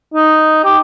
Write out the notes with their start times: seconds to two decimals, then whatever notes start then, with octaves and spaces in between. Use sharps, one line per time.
0.14 D#4
0.64 G4